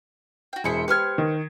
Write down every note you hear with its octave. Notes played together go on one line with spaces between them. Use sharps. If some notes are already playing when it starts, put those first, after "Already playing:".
F#4 G5
E1 E4 G#4 C5 E5 C#7
G4 B4 C5 F6 G#6
D#3